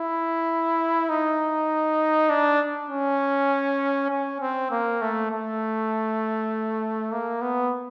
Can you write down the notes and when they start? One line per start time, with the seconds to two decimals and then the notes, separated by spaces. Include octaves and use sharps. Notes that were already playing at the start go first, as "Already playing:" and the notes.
Already playing: E4
1.09 D#4
2.30 D4
2.90 C#4
4.11 C#4
4.41 C4
4.71 A#3
5.01 A3
5.32 A3
7.12 A#3
7.42 B3